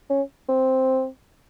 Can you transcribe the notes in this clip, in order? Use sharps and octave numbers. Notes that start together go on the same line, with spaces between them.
C#4
C4